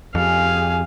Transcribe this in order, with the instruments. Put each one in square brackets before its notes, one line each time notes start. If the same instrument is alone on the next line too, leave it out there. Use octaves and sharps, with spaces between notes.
[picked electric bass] F2 [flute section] G4 G#4 G#5 [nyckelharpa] F5